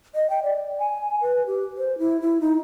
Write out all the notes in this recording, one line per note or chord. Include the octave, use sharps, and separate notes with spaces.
D#5
G5
D5
G#5
B4
G4
C5
E4
E4
D#4